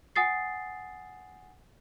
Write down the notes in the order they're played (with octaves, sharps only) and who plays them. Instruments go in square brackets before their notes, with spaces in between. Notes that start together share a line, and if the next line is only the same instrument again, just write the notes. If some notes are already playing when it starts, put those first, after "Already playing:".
[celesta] F#5 G#5 D#6 A6 C7